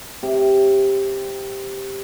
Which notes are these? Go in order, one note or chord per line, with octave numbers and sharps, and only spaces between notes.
C3 G4